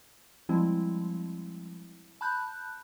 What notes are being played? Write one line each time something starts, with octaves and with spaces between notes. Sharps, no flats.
F3 G3 G#3 C4 E4
A5 B5 F#6 G6